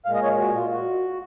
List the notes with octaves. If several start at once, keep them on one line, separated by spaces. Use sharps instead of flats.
A#2 G#3 F5
D#5
C#5
F#4
F4
F#4